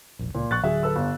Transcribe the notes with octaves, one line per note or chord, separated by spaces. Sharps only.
E1 A#1
C#2 A#2
A#1 C#6 F#6 A6
D1 D3 F#3 G#4 E5
A4 B4 E6
G1